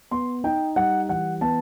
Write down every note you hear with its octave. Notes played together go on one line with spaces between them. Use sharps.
B3 C6
D#4 G5
G3 F#5
E3 F#5
B3 A5